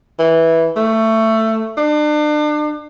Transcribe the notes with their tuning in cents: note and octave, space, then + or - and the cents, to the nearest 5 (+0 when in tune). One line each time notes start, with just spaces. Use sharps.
E3 -10
A3 +15
D4 +35